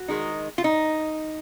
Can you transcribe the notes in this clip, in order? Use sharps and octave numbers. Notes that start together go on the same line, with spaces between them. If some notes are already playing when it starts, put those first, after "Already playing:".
Already playing: F#4
D#3 G#3 D#4
F4
D#4